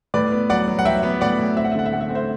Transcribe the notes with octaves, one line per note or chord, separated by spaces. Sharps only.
A2 B4 D5
B3
F#3 D5 F#5
F#3
F#5
F#3 E5 G5
B3
A2 D5 F#5
A2
C4 E5
F#5
E5
D3 F#5
E5
A3 F#5
E5
C4 F#5
C5 E5